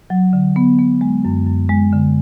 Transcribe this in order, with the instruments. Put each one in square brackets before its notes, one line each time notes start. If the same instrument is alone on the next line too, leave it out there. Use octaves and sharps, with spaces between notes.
[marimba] F#3
D3
B3
B3
G#3
F#2
F#2
G#3
D3